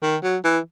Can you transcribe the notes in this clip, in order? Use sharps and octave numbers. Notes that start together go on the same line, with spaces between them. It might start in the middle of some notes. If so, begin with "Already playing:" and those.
D#3
F#3
E3